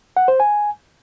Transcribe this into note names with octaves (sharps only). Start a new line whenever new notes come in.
F#5
C5
G#5